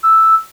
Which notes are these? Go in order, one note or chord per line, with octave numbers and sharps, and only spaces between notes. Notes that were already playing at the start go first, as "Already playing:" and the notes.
E6